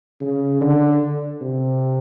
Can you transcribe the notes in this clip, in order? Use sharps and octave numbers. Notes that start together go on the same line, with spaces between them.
C#3
D3
C3